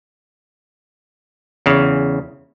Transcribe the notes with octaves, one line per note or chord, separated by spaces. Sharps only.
E2 C#3